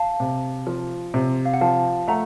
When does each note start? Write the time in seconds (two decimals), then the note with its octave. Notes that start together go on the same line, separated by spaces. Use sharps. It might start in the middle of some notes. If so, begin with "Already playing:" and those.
Already playing: F5 A5
0.20 C3
0.67 F3
1.14 C3
1.45 F5
1.54 F#5
1.61 F3 F5 A5
2.08 A3 F#5 A#5